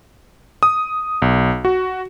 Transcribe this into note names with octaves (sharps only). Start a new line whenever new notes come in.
D#6
B1
F#4